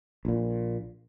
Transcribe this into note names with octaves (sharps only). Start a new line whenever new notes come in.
A#1 A#2